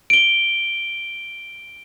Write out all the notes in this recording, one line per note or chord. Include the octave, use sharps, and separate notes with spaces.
D7 G7